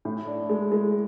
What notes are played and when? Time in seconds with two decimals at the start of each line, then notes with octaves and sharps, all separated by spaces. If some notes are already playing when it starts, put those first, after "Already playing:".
0.05 A2
0.27 D4
0.49 G#3
0.72 G#3